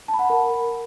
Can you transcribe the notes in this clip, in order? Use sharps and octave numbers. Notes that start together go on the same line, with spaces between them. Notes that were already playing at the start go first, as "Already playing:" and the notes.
A5
B5
F#5
B5
A#4